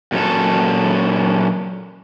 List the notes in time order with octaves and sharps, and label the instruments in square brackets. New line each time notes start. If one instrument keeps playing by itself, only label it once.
[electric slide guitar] A#2 F#3 C#4 A4